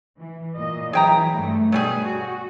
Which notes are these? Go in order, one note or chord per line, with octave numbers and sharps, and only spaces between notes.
E3
A#2 D#5
E3 F#3 E4 G#4 G5 A#5
G2 D3 A3
B2 F#3 G3 G#4
F#4